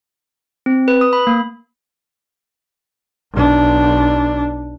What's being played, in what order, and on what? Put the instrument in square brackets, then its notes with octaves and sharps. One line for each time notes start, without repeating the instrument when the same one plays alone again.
[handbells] C4
B4
D#6
B5
A#3
[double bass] B1 D4